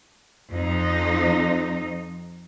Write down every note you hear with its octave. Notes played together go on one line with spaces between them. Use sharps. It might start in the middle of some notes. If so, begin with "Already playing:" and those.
F2 D#4